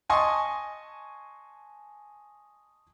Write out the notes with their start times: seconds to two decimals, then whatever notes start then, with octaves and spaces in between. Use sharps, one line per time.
0.09 D#5 G#5 A5 C6 C#6 D#6